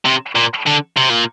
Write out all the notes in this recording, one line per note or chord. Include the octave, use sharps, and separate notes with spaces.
C3
A#2
D3
C3
A#2